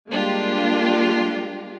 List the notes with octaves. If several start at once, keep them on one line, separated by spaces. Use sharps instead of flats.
G3 G#3 A#3 D4 F4 G4